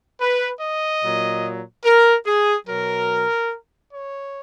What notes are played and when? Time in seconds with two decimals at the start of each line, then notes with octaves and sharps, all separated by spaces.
0.20 B4
0.61 D#5
1.03 A#2 F#3
1.85 A#4
2.27 G#4
2.67 B2 F#3 A#4
3.91 C#5